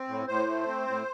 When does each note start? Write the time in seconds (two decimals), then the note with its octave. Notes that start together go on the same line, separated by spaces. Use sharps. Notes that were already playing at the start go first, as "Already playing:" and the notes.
Already playing: C4
0.08 A2
0.27 A2 C5
0.48 A3
0.67 C4
0.87 A2